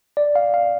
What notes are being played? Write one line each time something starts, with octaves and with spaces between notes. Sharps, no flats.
D5
F5
F5